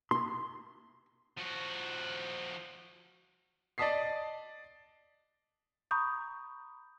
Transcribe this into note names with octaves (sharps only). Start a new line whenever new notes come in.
C6
F3 F#4
D5 D#5 A5 D#6 B6 C7
A#5 B5 C#6 D#6 G6